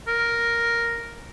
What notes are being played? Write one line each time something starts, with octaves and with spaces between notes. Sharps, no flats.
A#4